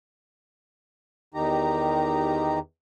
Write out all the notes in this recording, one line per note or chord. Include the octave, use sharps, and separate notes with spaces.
E2 D#3 D#4 G4 A#5